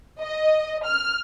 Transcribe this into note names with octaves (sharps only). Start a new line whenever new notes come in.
D#5
F6